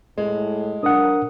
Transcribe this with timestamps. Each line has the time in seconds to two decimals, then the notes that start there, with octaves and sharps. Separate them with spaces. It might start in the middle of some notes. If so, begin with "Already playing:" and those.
0.18 A2 G#3
0.83 F3 F#3 D4 A#4 F#5 D#6